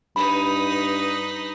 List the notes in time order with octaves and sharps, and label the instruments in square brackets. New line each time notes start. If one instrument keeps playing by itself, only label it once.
[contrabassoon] G2 [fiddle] D#4 B4 [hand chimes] B5